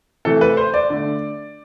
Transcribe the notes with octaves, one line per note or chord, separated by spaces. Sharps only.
C3 E3 A3 A4
B4
C5
D5
D3 A3